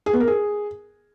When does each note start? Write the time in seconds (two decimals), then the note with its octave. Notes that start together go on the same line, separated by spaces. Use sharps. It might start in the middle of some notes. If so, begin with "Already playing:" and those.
0.06 G#4
0.13 B3
0.20 A#4
0.27 G#4